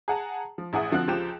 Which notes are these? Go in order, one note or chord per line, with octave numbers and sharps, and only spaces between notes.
G#4 F#5 A5 A#5
F3
A1 E4 G#4 F#5 D#6
D3 F3 C4 F#4 F#6
C#2 F3 F4 G4 G5 E7